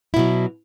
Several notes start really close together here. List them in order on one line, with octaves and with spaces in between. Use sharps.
E4 B2 F#3